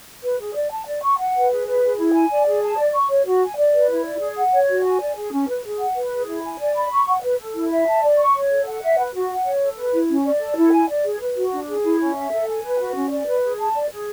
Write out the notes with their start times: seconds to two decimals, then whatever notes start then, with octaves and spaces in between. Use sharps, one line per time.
0.23 B4
0.39 G#4
0.55 D5
0.71 A5
0.87 D5
1.02 C#6
1.18 F#5
1.35 B4
1.51 G#4
1.66 B4
1.83 G#4
1.98 E4
2.14 G#5
2.30 D5
2.46 G#4
2.62 A5
2.77 D5
2.94 C#6
3.09 C#5
3.25 F#4
3.41 G#5
3.57 D5
3.73 B4
3.89 E4
4.05 D5
4.21 G#4
4.37 F#5
4.53 C#5
4.68 F#4
4.84 G#5
5.00 D5
5.16 G#4
5.32 C#4
5.48 B4
5.64 G#4
5.80 F#5
5.95 B4
6.12 G#4
6.27 E4
6.43 G#5
6.59 D5
6.75 B5
6.91 C#6
7.07 F#5
7.23 B4
7.39 A4
7.54 E4
7.71 E5
7.87 A5
8.02 D5
8.18 C#6
8.34 C#5
8.50 A4
8.66 F#5
8.82 E5
8.98 B4
9.14 F#4
9.30 F#5
9.45 C#5
9.61 A4
9.77 B4
9.93 E4
10.09 C#4
10.25 D5
10.41 A4
10.57 E4
10.72 G#5
10.89 D5
11.04 G#4
11.21 B4
11.36 F#4
11.52 D4
11.68 G#4
11.83 E4
12.00 C#4
12.16 E5
12.32 A4
12.47 G#5
12.63 B4
12.79 F#4
12.95 C#4
13.11 D5
13.27 B4
13.43 G#4
13.58 A5
13.75 D5
13.91 G#4